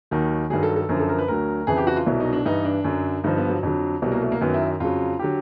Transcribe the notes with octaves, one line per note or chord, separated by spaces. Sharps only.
D#2 D#3 F#3
G2 D#3 F#3 G#4
A4
A4
F#2 D3 F3 A#4
A4
A#4
B4
D2 D3 F#3 A#4
F2 C#3 E3 G#4
G4
F#4
F4
C2 B2 F#3 E4
D#4
D4
G2 E3 D#4
D4
F#2 D3 F#3
G2 D3 F3 D#4
B3
F#3
F2 D3 F#3
C2 B2 F#3 G3
A#3
A3
A#3
F#2 D#3 F#3 B3
E4
F2 C#3 F#3 F4
D3 F#3 G4